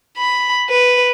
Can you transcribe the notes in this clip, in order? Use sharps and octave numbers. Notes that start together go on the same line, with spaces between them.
B5
B4